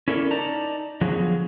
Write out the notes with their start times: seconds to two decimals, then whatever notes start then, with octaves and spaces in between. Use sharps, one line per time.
0.08 C#4 E4 A4 A#4 C5 D5
0.31 D#4 D5 A5 A#5
1.01 D3 F3 F#3 B3 F#4 G#4